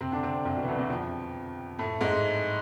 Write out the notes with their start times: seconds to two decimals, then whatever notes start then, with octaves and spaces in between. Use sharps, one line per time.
0.01 C3 C4
0.12 D3 D4
0.23 C3 C4
0.45 C2 C3
0.56 B2
0.63 E3
0.68 D2 D3
0.79 E2 E3
0.90 F2 F3
1.79 A2 A3
2.01 G#2 G#3